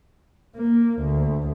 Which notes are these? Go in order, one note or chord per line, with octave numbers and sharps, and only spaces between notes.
A#3
D2